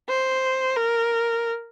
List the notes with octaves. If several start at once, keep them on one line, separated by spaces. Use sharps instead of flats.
C5
A#4